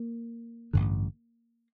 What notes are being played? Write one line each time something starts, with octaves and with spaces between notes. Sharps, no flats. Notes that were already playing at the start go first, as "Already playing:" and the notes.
Already playing: A#3
A1 G2 D3